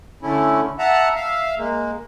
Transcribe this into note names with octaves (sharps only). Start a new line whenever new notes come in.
D3 A3 C#4 E4
E5 F#5 A5 A#5
E5 F5
G#3 A#3